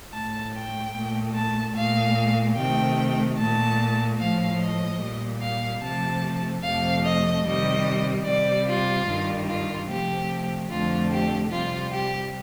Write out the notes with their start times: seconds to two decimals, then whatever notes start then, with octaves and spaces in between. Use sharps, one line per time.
0.12 A2 A3 A5
0.53 G5
0.94 A#2 A3
1.35 A5
1.75 A#2 A3 F5
2.57 C3 D#3 A3 G5
3.38 A#2 A3 A5
4.19 A2 F3 A3 F5
4.60 D#5
5.01 A#2 G3
5.41 F5
5.82 C3 F3 A3 A5
6.63 F2 C3 F3 A3 F5
7.03 D#5
7.45 C3 D#3 G3 D#5
8.26 C3 G3 D5
8.67 F4
9.07 G2 D#3 G3
9.47 F4
9.89 C3 F3 A3 G4
10.70 F2 D3 F3 A3 F4
11.11 G4
11.51 C3 G3 F4
11.92 G4